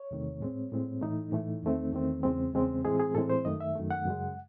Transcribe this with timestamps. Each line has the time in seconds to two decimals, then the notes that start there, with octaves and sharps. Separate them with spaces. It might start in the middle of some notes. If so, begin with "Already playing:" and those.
Already playing: C#5
0.11 E2 C3 D#3 A3
0.41 A2 G#3 C4
0.72 A2 G#3 C4
1.02 A2 E3 A3 D#4
1.32 A2 E3 A3
1.63 E2 D#3 A3 C4
1.93 E2 D#3 A3 C4
2.23 E2 C#3 G#3 C4
2.54 E2 C#3 G#3 C4
2.84 A2 E3 G#3 C4 G#4
3.00 G#4
3.15 A2 E3 G#3 C4 A4
3.30 C5
3.45 F#2 D#3 A3 D#5
3.61 E5
3.75 F#2 D#3 A3
3.91 F#5
4.06 F#2 C#3 G#3